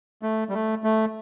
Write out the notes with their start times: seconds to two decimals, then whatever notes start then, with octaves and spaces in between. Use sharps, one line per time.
0.23 A3
0.49 G3
0.53 A3
0.84 A3